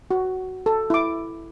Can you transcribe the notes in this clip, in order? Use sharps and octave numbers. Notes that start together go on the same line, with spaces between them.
F#4
A4
E4 D6